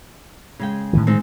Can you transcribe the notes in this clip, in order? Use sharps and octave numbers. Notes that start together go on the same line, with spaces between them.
C#3 G#3 G5
A2 D#3 E3
G#3 C4 D#4